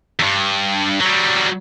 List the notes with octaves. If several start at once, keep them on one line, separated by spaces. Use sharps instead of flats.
E2 G2
F#3 G3